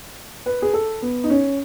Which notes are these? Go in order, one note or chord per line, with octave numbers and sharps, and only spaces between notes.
B4
G#4
A4
B3
D#4
C#4